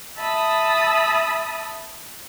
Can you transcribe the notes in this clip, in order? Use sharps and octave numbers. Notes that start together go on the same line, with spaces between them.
E5 A5 B5 D#6